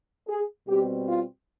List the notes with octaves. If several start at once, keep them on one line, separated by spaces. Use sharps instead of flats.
G#4
B2 G3 C4 G4
F4